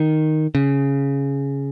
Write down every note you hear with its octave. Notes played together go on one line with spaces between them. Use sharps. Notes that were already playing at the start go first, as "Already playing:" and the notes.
Already playing: D#3
C#3